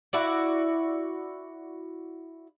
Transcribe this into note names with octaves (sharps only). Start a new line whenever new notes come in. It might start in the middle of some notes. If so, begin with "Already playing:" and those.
E4 F#4 D5